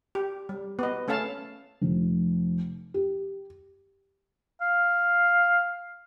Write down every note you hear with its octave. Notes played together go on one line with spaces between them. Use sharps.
G4
G3
B3 D#5
A3 C#4 A4 F5 A5
F1
G4
F5